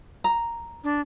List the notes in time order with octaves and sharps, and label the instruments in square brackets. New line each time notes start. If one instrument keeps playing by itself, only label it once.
[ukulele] A#5
[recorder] D4